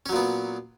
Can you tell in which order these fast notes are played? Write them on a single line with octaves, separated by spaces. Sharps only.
C#4 F#3 A#2 B3